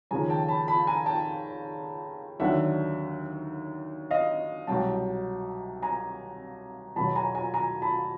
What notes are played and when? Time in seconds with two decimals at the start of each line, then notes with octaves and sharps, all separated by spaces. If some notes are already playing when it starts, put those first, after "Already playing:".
0.11 D#2 C#3 F3 G#5 A#5
0.29 G5 A5
0.49 A5 B5
0.68 A5 B5
0.87 G#5 A#5
1.06 G5 A5
2.40 D#2 D3 F#3 E5 F#5
4.11 D#5 F5
4.67 C2 B2 F#3 G5 A5
5.82 G#5 A#5
6.96 E2 B2 F#3 A5 B5
7.16 G#5 A#5
7.35 G#5 A#5
7.54 G#5 A#5
7.82 A5 B5